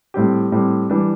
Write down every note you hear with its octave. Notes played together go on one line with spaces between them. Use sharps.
A2 G3 C4 G4
A2 G3 C4 G4
E3 G3 D4